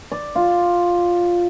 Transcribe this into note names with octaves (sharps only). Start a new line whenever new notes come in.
D5
F4